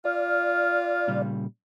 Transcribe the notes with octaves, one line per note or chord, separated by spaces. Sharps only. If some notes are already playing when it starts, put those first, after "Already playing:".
F4 D5 F6
A#2 C#3 G3